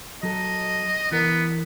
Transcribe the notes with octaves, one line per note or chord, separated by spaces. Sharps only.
F#3 A4 D#5
E3 B3 A#4